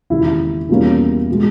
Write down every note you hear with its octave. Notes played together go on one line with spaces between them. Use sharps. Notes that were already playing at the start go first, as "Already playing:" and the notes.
E1 D#2 C#3 E4
E2 B2 G3 A#3 C#4
B2 G#3